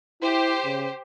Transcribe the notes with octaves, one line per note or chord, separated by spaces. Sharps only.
E4 G4 C5
C#3